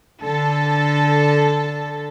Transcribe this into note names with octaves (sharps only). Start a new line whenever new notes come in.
D3 A4